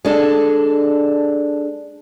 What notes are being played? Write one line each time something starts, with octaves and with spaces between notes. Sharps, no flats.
G#3 D4 A4